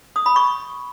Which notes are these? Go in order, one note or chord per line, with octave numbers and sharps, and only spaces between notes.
D#6
B5
C#6